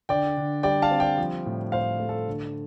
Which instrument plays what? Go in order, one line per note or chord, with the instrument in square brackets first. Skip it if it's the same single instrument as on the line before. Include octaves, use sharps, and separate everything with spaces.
[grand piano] D3 D5 G5
D3
G3 D5 G5
F5 A5
C4
D5 G5
F3
A2
A2 C5 F5
A3
A4
D3